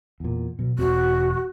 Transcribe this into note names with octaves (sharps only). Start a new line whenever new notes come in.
E2 A#2
B2 F#3
E1 C4 F#4